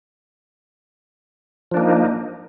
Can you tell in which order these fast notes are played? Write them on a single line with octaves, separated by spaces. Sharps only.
F3 D4 A#3 D#4